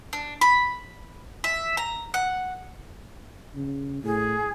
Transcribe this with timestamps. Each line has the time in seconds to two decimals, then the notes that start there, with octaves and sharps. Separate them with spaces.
0.13 D4
0.41 B5
1.44 E5
1.77 A#5
2.14 F#5
3.55 C#3
4.04 A2 G#4